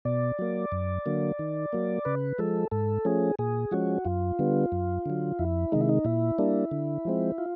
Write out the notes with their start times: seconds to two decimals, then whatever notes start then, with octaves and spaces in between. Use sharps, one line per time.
0.05 B2 D5
0.39 F#3 A#3
0.72 F#2
1.06 D3 F#3 A#3
1.39 D#3
1.73 F#3 A#3
2.05 C#3 B4
2.38 F3 G#3 A4
2.71 G#2 A4
3.05 F3 A3 C#4 G#4
3.39 A#2 G#4
3.71 F3 G#3 C#4 F#4
4.05 F#2 F4
4.39 D3 G3 B3
4.72 F#2
5.06 D3 F#3
5.39 F2 E4
5.72 C3 D#3 G#3 D#4
5.81 E4
5.89 D#4
6.05 A#2 E4
6.38 G3 A#3 D4
6.71 D3
7.05 F3 G#3 C4
7.38 F4